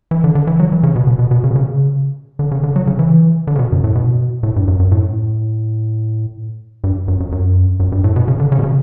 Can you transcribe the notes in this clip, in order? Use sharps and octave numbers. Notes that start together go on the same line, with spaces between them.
E3
D3
D3
E3
F#3
E3
C#3
B2
B2
B2
B2
C#3
B2
C#3
D3
C#3
D3
F#3
C#3
E3
D3
C#3
B2
F#2
A2
B2
A2
G2
F#2
F#2
A2
G2
F#2
F#2
F#2
F#2
G2
A2
B2
C#3
D3
C#3
B2
C#3